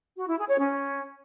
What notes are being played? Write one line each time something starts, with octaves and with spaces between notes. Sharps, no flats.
F#4
E4
G#4
C#5
C#4